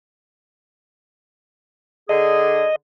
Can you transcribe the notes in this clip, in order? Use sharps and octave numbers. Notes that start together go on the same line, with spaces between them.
D3 G#4 D#5